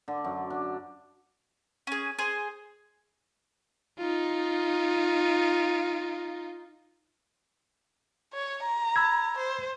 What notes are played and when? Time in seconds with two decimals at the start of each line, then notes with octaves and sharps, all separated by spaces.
0.08 D3
0.24 F#2
0.50 D4
1.87 C#4 G#4
2.19 G#4 C5
3.98 D#4 F4
8.33 C#5
8.63 A#5
8.96 B5 E6 G#6
9.39 C5